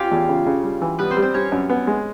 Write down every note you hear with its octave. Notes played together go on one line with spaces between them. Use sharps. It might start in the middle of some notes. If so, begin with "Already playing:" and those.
Already playing: C#4 F4 G4 C#5 F5 G5
E2
C#3
C#3
G3
E3
G3 B3 B4
C4 C5
G3
C4 C5
G3 C#4 C#5
F#2
B3
G#3